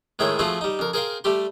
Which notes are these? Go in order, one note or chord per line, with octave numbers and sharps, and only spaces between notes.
A2 D#3 G#3 E4 C#5 G5
F3 A3 C4 F4 F#4 G#4
G3 D#4
F2 A#4
G#4 A#4 C5 F5 G5
G3 A3 G4 C6